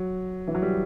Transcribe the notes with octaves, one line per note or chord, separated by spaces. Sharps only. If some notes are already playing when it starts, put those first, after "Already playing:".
Already playing: F#3
E3
F#3
G3